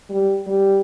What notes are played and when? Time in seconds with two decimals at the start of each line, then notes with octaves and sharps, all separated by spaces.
0.10 G3
0.48 G3